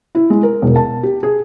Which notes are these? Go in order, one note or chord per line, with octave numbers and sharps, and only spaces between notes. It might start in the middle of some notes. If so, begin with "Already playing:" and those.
E4
G#3
A#4
E1
A5
G4
G#4